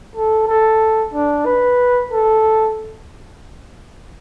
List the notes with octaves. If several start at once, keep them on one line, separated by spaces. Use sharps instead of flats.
A4
A4
D4
B4
A4